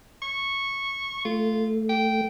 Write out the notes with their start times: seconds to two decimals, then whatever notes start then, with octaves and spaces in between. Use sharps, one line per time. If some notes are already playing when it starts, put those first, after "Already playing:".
0.22 C#6
1.25 A3 F4
1.89 G5